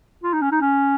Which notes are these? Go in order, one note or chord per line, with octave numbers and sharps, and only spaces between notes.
F4
D#4
C#4
D#4
C#4